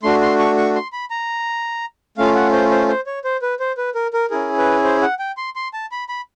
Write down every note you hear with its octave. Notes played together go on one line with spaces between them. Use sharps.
A3 D4 F#4 C6
C6
C#6
C#6
C6
B5
A#5
A3 C#4 F4 F5
F#5
C5
C5
C5
C#5
C5
B4
C5
B4
A#4
A#4
C#4 E4 G#4 A#4
B4
C5
F#5
G5
C6
C6
A5
B5
B5